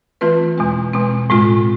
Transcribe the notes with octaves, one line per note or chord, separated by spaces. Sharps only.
E3 A3 C4 F4 B4
E2 B2 G#3 C4
E2 B2 G#3 C4
A2 G#3 C4 F4